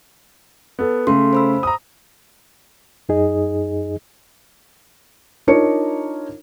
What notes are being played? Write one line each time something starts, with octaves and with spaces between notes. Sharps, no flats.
B3 A4
C#3 A3 A4 C6
C5 B5 E6
A#5 D#6
F#2 D#4 G#4 D#5
D4 D#4 F4 A#4 C#5 C#7